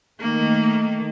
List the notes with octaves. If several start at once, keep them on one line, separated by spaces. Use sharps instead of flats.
D#3 A3 A#3